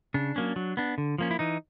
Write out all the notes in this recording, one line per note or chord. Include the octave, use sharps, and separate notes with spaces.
C#3 D4
F#3 A#3 C#4
F#3
B3 D4
D3
F3 A#3 C#4
E4
E3 D#4